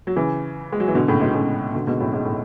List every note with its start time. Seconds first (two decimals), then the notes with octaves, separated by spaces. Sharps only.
0.07 F#3
0.16 C#3 E3
0.72 G#3
0.80 F#3
0.88 E3
0.95 B2 D3
1.08 A2 C#3
1.21 G#2 B2
1.34 A2 C#3
1.74 B2 D3
1.87 G#2 B2
2.00 F#2 A2
2.13 G#2
2.25 A2